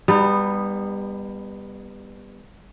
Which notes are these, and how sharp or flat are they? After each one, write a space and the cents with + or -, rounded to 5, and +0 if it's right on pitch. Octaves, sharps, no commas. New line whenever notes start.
G3 +25 B3 +0 D#4 -20